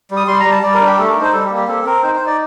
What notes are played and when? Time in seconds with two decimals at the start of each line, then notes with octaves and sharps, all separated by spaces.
0.11 G3
0.17 D#6
0.27 G3 C6
0.40 G3 A#5
0.52 A5
0.63 G3 D5
0.74 A#4
0.81 D4
0.86 G4
0.98 A3 A4
1.09 A#4
1.16 D#4
1.21 C5
1.33 G3 A4
1.45 G4
1.50 A#3
1.57 G4
1.68 C4 A4
1.85 C4 A#4
2.03 D#4 C5
2.15 C5
2.21 D#4
2.27 D5